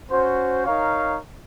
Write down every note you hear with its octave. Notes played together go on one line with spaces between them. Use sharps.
C#4 F#4 C5
D#4 A#4 C#5 F5